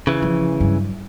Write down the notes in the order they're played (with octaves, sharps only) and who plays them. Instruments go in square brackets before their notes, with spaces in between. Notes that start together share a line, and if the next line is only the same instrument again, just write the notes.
[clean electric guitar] C#3 E3
[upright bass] F3 E4
G2 F#3